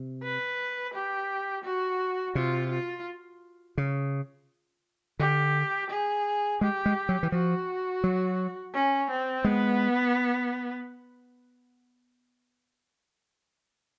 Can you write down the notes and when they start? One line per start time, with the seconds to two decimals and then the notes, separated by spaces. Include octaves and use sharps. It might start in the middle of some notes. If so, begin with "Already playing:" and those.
Already playing: C3
0.23 B4
0.94 G4
1.64 F#4
2.35 C3 F4
2.71 F4
3.78 C#3
5.19 D3 G4
5.90 G#4
6.61 G#3 G4
6.86 G#3
7.09 F#3
7.23 E3
7.32 F3 F#4
8.04 F#3
8.74 C#4
9.10 C4
9.44 G#3 B3